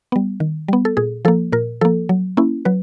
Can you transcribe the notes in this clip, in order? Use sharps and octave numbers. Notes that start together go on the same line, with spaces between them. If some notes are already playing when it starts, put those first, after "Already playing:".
G3 B3
D#3
G3 B3
A4
A#2 G#4
F3 A#3 A4
A#2 A#4
F3 A#3 A4
F#3
A#3 C#4 E4
F#3 B4